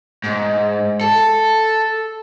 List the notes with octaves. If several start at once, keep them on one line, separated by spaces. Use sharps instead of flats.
G#2
A4